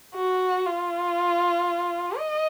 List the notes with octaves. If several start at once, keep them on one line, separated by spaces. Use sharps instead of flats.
F#4
F4
D#5